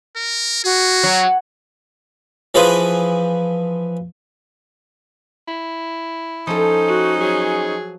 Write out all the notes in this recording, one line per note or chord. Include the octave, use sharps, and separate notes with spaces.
A#4
F#4 G#4
F#3
E3 F3 G#4 B4 C5
E4
F3 C#4 D#4 A4 C5
F#4
F#3 G#4